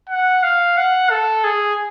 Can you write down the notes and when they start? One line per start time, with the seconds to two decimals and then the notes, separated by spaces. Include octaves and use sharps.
0.09 F#5
0.43 F5
0.77 F#5
1.10 A4
1.44 G#4